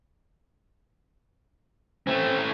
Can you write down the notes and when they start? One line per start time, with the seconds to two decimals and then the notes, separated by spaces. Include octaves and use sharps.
2.07 A3 C4 C#4